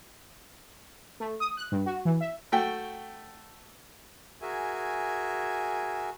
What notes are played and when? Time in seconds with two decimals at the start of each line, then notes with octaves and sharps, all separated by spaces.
1.20 A3
1.40 D#6
1.57 F#6
1.72 G2
1.86 F#4
2.05 E3
2.21 E5
2.52 A3 F#4 G5
4.41 F#4 G#4 A#4 E5 G#5